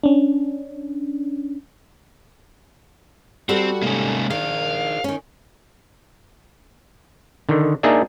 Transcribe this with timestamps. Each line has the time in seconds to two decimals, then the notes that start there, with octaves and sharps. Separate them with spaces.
0.04 C#4 D4
3.49 G3 C4 F#4 G4 A4
3.82 C3 G#3 A#3 C#4 D#4
4.30 D#3 G#4 A#4 D5 F5
5.04 D#3 C#4
7.49 D3 D#3
7.83 A#3 D4 D#4 G#4 D5 E5